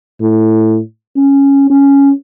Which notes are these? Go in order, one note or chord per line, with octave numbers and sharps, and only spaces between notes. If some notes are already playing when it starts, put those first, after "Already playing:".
A2
C#4
C#4